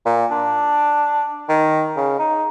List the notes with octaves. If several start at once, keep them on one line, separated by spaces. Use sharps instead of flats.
A#2
D4
D#3
C#3
D#4